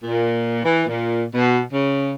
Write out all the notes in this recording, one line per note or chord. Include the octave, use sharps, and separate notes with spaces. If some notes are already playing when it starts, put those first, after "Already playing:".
A#2
E3
A#2
B2
C#3